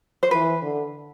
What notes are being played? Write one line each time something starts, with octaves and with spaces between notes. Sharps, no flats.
C5
E3 B4
D3